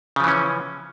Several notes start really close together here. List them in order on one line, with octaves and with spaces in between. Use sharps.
C#3 F3 E3 C#4